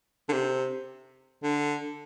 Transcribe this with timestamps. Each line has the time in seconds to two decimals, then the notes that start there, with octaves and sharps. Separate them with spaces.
0.29 D3
0.32 C3
1.43 D3